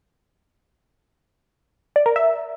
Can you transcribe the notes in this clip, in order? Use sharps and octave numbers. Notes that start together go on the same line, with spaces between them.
D5
A#4
E5